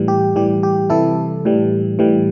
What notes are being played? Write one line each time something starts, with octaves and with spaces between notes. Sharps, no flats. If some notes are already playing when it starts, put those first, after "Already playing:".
Already playing: A2 E3 G3
G4
A2 E3 G3 G4
G4
C3 E3 G3 E4 A4
A2 E3 G3
A2 E3 G3